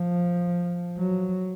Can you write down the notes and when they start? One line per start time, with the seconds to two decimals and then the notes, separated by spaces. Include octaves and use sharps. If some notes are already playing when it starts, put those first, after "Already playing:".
Already playing: F3
0.98 F#3